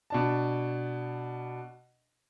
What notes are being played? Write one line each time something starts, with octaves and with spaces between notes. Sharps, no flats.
B2 D4 A5